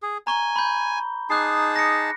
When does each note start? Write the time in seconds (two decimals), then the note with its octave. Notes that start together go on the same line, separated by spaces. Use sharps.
0.03 G#4
0.27 G#5 A#5 C#6 G7
0.56 B5 G6
1.30 D#4 G#4 A5 D6 F#6 C7
1.76 A#6 C#7